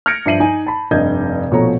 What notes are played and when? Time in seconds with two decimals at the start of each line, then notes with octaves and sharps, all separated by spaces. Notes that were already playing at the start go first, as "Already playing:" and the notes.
0.06 F6 G6 G#6 A#6 C#7 D7
0.26 G2 F3 E5 C7 D#7 F#7
0.40 D#4 G#5
0.66 A5 B5
0.91 F1 G2 D#5 G6 G#6
1.51 A#1 B2 F3 A3 C#5 A#5